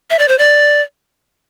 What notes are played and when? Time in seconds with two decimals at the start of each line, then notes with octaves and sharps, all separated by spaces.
0.10 E5
0.19 D5
0.28 C5
0.38 D5